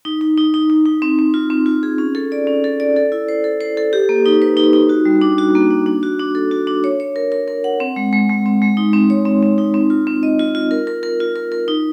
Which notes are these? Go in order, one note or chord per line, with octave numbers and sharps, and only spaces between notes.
D#4
D#4
D#4
D#4
D#4
D#4
C4
C4
F4
C4
F4
G#4
C#4
A4
D5
C#4
A4
D5
A4
E4
C5
A4
C5
A4
G4
A#3
D#4
B4
D#4
D#4
F#4
G3
D4
F#4
A#3
D4
D4
F#4
D4
A4
F#4
D4
C#5
C#5
A#4
A#4
A#4
F#5
C4
G#3
G#3
G#3
C4
G#3
D#4
C4
C#5
C4
C4
D#4
C4
F4
C4
D#5
F4
F4
A#4
A#4
A#4
F4
A#4
A#4
D#4